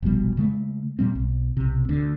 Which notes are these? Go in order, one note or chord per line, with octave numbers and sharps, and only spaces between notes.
F1 A#1 B2 G3
C#3 G#3 A3
A#2 G3 C4
B1
B1 C3
D2 D3